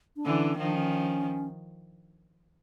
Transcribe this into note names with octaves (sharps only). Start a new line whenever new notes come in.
D4
D3 E3 C#4
D#3 F3
D4
C#4